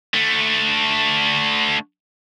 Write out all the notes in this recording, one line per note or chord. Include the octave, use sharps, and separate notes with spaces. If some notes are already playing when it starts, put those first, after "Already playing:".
D3 A3